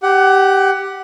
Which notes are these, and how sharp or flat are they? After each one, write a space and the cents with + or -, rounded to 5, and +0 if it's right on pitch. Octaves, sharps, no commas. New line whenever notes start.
G4 +0 F#5 +25